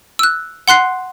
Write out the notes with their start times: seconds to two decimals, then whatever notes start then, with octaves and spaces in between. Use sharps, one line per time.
0.19 E6 F#6
0.68 F#5 C6 F#6 C7